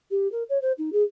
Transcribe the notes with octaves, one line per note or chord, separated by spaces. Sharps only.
G4
A#4
C#5
C5
D#4
G#4